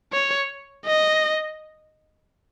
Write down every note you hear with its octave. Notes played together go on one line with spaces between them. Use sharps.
C#5
D#5